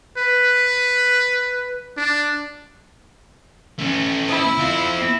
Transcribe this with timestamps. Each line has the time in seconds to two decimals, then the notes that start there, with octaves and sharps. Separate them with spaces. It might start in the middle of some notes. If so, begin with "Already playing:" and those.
0.18 B4
1.97 D4
3.79 A3 C#4
4.28 E4
4.59 C4 F4